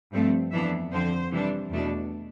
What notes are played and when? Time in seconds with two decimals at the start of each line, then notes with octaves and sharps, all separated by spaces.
0.13 G2 F3 A3 C4
0.51 F2 E3 B3 D4 E5
0.92 F2 D3 F3 C4 C5
1.30 C3 E3 G3 D4
1.71 E2 B2 A3 D4